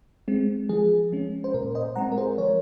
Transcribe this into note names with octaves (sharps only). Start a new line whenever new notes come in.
G#3 C4
F3 G#4
G#3 C#4
C5
A#2 A#4
C5 D#5
G#3 C4 F#5 A#5
A#4
G#4 C5
F3 A#4 C#5